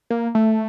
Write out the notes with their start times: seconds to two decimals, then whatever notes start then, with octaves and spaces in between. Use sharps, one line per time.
0.10 A#3
0.35 A3